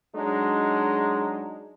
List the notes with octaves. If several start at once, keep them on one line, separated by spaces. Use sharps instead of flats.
F#3 G#3 D4 D#4